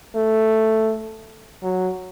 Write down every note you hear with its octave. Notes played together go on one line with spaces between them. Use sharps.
A3
F#3